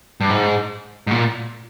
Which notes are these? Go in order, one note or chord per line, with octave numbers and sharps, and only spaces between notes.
G2
G#2
G#2
A#2